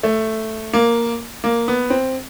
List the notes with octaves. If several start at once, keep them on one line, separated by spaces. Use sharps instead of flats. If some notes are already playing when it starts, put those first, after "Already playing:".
A3
A#3
A#3
B3
C4